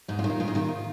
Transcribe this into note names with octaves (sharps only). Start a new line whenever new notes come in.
G#2 D#4
F4
D#3
D#4
G#2 F4
D#4
D#3 F4